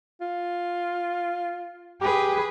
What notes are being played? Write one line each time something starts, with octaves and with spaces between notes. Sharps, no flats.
F4
G4 G#4 B4